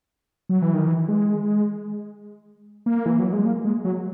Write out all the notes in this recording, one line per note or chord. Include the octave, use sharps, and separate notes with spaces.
F#3
E3
D#3
E3
G#3
A#3
E3
F#3
G#3
A#3
G#3
F#3